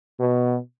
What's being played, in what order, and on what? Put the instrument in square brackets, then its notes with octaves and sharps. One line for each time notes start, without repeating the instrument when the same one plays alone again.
[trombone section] B2